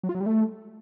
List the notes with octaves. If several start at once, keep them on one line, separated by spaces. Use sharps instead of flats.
F#3
F4
F#3
G3
A3